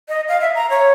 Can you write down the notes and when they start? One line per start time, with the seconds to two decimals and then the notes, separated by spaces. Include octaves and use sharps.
0.08 D#5
0.28 F5
0.41 E5
0.55 A#5
0.70 C#5